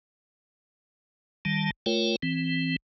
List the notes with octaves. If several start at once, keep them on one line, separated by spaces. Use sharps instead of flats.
D#3 G3 A5
A3 F4 A#4 C#5 G5
E3 C4